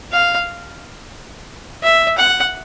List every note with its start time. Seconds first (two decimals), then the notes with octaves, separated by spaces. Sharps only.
0.12 F5
1.83 E5
2.18 F#5